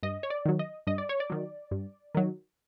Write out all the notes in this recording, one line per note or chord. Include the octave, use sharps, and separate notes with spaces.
G2 D#5
C#5
D5
D#3 F#3
D#5
G2 D#5
D5
C#5
D5
D#3 F#3
G2
D#3 F#3